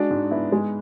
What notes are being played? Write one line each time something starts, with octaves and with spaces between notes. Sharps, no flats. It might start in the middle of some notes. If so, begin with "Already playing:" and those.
Already playing: G#3 D4 F#4
G#2
B3 E4
G#3